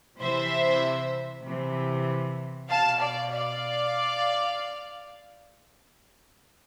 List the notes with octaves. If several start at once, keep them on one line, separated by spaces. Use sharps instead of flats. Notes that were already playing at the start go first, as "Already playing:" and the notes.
C3 E3 C5 E5
C3 E3
B2 F5 A5
D5 F5
D5 F5